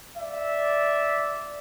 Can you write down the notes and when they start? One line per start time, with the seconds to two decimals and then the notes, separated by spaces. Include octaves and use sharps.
0.17 D5 E5